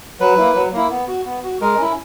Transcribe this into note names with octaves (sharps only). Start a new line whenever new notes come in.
F#3 B4
A#3 E4
F#3
A#3 E4
B3
F#4
B3
F#4
G#3 A#4
C#4 E4